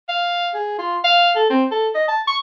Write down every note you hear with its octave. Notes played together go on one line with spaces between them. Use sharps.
F5
G#4
F4
F5
A4
C4
A4
D#5
A5
C#6